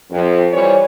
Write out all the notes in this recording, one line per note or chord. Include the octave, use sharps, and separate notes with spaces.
F2
E3 G3 C5 C#5